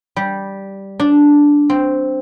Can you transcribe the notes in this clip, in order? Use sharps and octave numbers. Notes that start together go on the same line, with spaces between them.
G3
D4
C4